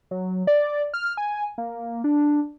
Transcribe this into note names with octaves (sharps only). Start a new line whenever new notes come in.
F#3
D5
F6
G#5
A#3
D4